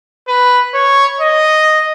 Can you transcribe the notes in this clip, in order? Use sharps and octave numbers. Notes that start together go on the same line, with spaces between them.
B4
C#5
D#5